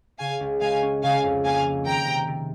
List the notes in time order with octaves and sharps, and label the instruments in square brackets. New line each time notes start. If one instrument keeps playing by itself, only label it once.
[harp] C#3 [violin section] F5 G#5
[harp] C#2
[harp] G#3 [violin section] F5 G#5
[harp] C#4
[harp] C#3 [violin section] F5 G#5
[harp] F2
[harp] A#3 [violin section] F5 G#5
[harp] F3
[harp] D#3 [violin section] G5 A#5
[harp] C3
C3